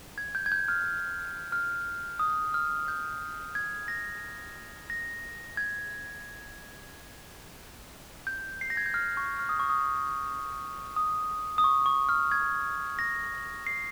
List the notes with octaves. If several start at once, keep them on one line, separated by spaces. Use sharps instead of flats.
G#6
G6
G#6
G6
F6
F6
D#6
F6
G6
G#6
A#6
A#6
G#6
G6
C7
A#6
G#6
G6
F6
C#6
F6
D#6
C#6
D#6
D#6
D#6
C#6
C#6
F6
G#6
A#6
C7